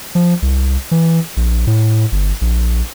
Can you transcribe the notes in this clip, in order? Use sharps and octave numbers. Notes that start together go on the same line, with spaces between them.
F3
C2
E3
A#1
A2
G1
A#1